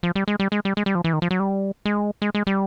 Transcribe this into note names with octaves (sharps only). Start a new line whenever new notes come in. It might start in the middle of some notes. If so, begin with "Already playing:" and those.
F3
G3
G#3
G3
G#3
G3
G#3
G3
F3
E3
D#3
F3
F#3
G3
G#3
G#3
G#3
G3